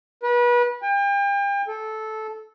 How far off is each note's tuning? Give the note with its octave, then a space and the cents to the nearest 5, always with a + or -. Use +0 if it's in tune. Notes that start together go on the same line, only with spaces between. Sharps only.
B4 -30
G5 +40
A4 -10